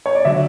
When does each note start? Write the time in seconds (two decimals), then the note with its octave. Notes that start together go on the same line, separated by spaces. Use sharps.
0.06 C#5
0.15 D5
0.25 D3 F#3 E5